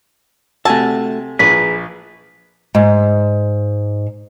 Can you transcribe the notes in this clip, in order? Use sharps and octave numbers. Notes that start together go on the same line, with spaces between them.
C3 A3 F#4 G#5 A5 E6
A#1 G#4 B4 B6
G#2